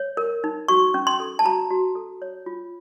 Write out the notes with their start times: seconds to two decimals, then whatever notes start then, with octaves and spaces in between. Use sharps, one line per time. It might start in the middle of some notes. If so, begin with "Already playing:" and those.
Already playing: C#5
0.17 A#4
0.44 D#4
0.68 F#4 C#6
0.94 C#4
1.07 C6
1.20 A4
1.39 A5
1.45 F#4 A#5
1.70 F#4
1.95 A4
2.22 C#5
2.46 F4